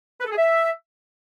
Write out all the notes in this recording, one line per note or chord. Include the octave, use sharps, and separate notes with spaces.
B4
A4
G#4
E5